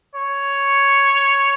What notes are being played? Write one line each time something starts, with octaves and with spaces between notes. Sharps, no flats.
C#5